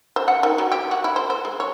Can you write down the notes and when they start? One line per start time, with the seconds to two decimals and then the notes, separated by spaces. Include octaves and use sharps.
0.16 C5
0.28 F#5
0.43 D#3
0.58 F#3
0.72 G4
0.91 F#4
1.04 E4
1.16 C5
1.30 C5
1.45 G#3
1.60 C#5